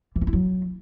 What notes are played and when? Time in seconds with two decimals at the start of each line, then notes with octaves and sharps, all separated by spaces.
0.16 E3
0.21 D#4
0.27 E4
0.33 F#3